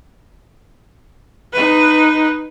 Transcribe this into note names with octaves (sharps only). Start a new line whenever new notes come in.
D#4 B4